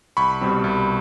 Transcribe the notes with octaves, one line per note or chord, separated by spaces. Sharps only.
C2 B5 C#6
B2 G3 C4
C2